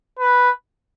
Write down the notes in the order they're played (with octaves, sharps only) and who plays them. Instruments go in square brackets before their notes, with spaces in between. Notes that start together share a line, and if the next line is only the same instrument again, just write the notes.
[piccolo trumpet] B4